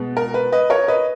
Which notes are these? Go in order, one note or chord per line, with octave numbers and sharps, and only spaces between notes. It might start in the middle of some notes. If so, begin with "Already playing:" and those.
Already playing: B2 G#3 B3
A#4
B4
B4 D#5
A#4 C#5
B4 D#5